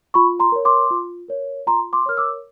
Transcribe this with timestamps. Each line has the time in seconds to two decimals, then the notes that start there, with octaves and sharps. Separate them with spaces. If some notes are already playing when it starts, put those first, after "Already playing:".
0.14 F4 B5 C#6
0.40 A#5 C6
0.52 A#4 C#5
0.65 C6 D6
0.91 F4
1.28 A#4 C#5
1.67 F4 A#5 C6
1.93 C6 D6
2.06 A#4 C#5 F6
2.17 D6 E6